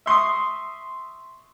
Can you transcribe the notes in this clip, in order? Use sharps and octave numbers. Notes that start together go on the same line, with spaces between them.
E5 C6 C#6 D#6